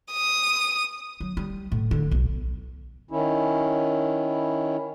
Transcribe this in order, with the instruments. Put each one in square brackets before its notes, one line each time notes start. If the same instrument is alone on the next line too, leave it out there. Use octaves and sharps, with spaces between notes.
[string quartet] D#6
[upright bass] F#3
G3
A2
D3
B1
[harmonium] D#3 C#4 E4